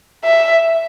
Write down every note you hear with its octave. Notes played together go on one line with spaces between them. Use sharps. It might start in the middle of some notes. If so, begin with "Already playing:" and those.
E5